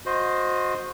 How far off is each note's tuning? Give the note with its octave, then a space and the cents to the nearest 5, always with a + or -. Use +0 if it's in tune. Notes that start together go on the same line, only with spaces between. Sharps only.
F#4 -30 C5 +0 D#5 +0